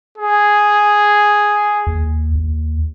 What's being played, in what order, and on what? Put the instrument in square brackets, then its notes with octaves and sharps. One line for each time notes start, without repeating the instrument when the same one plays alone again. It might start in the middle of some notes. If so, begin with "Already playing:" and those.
[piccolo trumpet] G#4
[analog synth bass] D#2
D#2